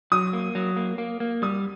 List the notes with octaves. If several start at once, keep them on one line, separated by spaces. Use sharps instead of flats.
F#3 D#6
A#3
F#3
A#3
A#3
A#3
G3 D#6